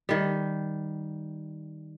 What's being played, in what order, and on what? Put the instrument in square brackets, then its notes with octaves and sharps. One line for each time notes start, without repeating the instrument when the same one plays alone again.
[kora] D#3 G3